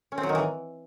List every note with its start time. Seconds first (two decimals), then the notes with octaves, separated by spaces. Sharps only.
0.12 C#4
0.18 C4
0.23 F#3
0.29 D#3
0.35 E3